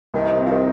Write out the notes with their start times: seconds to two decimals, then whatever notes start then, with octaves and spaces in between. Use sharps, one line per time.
0.14 C2 C3 D#3
0.38 C4
0.45 F3
0.50 C3 D#3